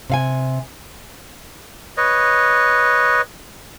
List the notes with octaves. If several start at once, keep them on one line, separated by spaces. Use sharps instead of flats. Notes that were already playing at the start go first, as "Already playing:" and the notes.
C3 F5 G#5
B4 C#5 D#5